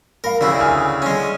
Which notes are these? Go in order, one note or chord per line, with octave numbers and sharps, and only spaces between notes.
A#4 F5 B5
D2 C#3 E4
G#5 D#6 F6
G#3 C#4